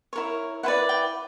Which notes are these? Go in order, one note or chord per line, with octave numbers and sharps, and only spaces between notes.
E4 A#4 C#5
E4 B4 D5 F#5
G5